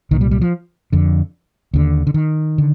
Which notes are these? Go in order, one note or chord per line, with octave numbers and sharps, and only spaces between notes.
C2 A#2 D#3
G3
G3
F3
F2 D3
D#2 D3
D3
D#3
D3